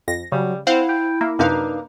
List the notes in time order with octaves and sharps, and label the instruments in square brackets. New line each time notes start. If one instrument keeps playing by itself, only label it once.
[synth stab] F2 A#6
[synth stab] C#3 [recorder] F#3 [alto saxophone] G3
[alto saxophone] C4 [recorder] E4 [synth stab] C5 F5 F#5
[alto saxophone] G5
[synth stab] A#3 [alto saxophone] E5
[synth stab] F#2 C3 F5 [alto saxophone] A#3 [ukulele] D4 D#4 B4